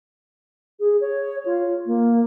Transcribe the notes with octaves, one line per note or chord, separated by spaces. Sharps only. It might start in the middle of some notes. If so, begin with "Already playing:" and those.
G#4
C#5
F4
A#3